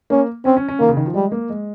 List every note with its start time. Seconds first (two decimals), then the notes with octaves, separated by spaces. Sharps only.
0.10 A#3 C#4
0.45 C4 C#4
0.57 C#4
0.68 C#4
0.79 D#3 A#3
0.89 C#3
0.97 D#3
1.06 F3
1.14 G3 G#3
1.32 A#3
1.50 G#3